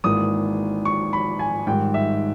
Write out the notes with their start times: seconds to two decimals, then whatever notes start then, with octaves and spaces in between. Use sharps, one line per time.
0.04 G#1 G#2 E3 A#3 D#6
0.85 C#6
1.13 B5
1.39 G#5
1.67 G#2 D#3 G3 G5
1.94 E5